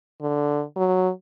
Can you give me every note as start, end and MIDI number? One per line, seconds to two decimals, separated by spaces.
0.21 0.63 50
0.76 1.10 54